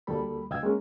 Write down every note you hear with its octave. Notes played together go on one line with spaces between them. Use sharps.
D2 G3 A#3 A4 B5
C#2 D#5 F5 G5 E6 G#6
G#3 A#3 C#4